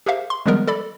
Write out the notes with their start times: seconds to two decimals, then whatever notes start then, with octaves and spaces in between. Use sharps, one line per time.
0.06 G4 G#4 A#4 C5 E5 F5
0.30 C6
0.46 D#3 F3 G3 G#3 B3 A#4
0.67 A4 D5 B5